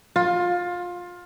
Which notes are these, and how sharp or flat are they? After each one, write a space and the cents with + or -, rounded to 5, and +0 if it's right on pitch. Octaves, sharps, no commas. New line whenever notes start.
F4 +20